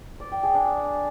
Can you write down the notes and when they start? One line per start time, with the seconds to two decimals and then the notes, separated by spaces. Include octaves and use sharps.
0.20 D5
0.32 G5
0.43 G#4
0.55 D4